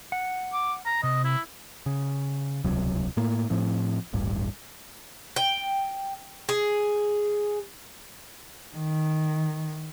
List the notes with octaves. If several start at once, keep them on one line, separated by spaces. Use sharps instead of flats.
F#5
D6
A#5
C3 D#5
E4
C#3
D#1 C#2 C3 F#3
A2 A#3
A2 F3 C4
D#1 A1 G2
G5
G#4
D#3